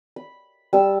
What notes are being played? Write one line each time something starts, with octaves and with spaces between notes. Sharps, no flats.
B5
G3 A5 E6